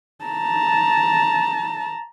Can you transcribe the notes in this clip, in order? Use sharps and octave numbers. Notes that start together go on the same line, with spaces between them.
A5 A#5